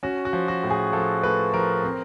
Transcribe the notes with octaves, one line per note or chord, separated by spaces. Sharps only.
C#4 F#4
F#4
F3
F#4
A2
G#4
F3 A4
A3 B4
F3 A#4
C4